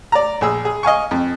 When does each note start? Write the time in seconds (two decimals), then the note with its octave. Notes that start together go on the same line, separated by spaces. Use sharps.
0.12 D5 A#5
0.41 A#1 G#4 E6
0.65 G#4
0.83 D#5 F5 G#5 C#6
1.11 F2